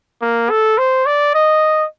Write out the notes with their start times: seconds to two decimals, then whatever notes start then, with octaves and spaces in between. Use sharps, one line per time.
0.22 A#3
0.50 A4
0.78 C5
1.06 D5
1.34 D#5